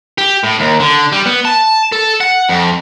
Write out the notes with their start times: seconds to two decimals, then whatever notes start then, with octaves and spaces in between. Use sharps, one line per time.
0.18 G4
0.44 A2
0.60 D#2
0.80 D3
1.12 G3
1.26 B3
1.45 A5
1.92 A4
2.21 F#5
2.49 F2